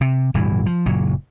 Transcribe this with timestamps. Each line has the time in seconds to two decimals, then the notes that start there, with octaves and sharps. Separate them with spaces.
0.01 C3
0.34 D1 G2 B2 E3
0.66 F3
0.86 F#1 A#2 F#3